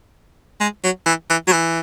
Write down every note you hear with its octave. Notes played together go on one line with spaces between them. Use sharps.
G#3
F#3
E3
E3
F#3
E3